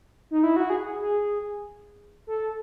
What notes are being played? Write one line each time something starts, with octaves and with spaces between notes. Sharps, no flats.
D#4
E4
F#4
G#4
G#4
G#4
A4